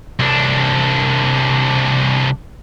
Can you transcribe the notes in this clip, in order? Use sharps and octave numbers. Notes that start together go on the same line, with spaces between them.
C2 D4